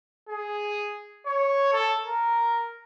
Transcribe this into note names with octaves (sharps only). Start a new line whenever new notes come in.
G#4
C#5
A4
A#4